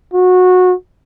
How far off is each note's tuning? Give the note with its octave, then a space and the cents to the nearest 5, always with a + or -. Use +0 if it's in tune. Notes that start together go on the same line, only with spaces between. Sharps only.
F#4 -20